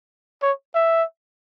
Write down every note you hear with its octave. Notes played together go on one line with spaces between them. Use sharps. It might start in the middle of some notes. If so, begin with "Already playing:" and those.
C#5
E5